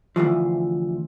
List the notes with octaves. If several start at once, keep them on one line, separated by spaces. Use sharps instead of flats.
D2 G#2 E3 F3